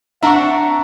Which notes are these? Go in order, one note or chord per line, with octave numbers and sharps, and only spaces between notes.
C4 D4 E5 F#5 A5 A#5 C#6